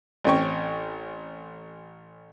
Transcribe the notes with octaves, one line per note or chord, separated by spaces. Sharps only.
A1 C4 C#4 G5 C#6